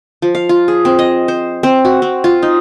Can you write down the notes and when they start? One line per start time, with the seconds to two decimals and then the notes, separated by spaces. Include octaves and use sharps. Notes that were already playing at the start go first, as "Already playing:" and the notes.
0.22 F3
0.35 F5
0.49 F4
0.68 G#4
0.85 C4
0.99 D#5
1.28 C5
1.63 C4
1.85 F#4
2.02 C4
2.24 F4
2.43 D#4